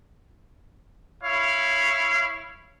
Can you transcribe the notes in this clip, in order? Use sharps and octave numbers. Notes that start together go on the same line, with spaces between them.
E4 C#5 F5